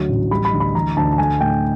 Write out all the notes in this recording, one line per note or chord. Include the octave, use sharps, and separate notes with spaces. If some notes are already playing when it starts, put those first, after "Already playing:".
Already playing: D2 F#3
A1
G3 B5
B5
D2
B5
E3 A#5
D2 A5
A5
A3 G#5
A2 G5